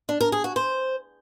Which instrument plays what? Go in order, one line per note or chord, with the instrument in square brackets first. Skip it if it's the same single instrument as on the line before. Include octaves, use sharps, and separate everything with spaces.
[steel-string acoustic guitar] D4
A#4
G#4
F#4
C5